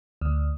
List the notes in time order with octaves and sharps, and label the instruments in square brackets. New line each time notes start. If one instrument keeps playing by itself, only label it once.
[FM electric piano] D2